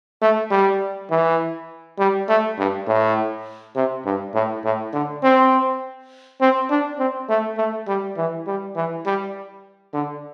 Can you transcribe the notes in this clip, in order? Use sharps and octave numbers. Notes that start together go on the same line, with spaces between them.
A3
G3
E3
G3
A3
G2
A2
C3
G2
A2
A2
D3
C4
C4
D4
C4
A3
A3
G3
E3
G3
E3
G3
D3